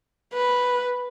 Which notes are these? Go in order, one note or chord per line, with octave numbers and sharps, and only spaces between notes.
B4